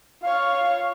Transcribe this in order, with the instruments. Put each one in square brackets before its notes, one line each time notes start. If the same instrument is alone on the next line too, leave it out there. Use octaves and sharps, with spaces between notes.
[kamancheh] F4 C#5 [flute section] F5 F6